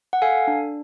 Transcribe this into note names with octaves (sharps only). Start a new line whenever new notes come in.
F#5
A4 F5 G#5
D4